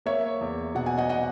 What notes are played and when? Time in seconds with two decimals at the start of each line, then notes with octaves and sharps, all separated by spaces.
0.06 A#3 C#5 E5
0.41 E2
0.75 B2 F#5
0.86 G#5
0.98 D#5 F#5
1.09 D#5 F#5